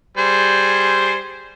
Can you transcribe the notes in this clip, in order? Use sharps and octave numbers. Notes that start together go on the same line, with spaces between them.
G3 G#4 C5